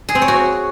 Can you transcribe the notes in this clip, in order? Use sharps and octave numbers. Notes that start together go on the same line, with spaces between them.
G#4
C4
C#5
F#4